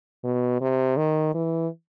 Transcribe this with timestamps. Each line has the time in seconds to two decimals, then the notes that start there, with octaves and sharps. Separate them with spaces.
0.24 B2
0.61 C3
0.98 D#3
1.35 E3